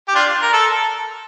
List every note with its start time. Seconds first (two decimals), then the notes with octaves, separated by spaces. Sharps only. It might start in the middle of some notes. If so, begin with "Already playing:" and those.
0.08 G4
0.15 D4 F4
0.42 A#4
0.53 A4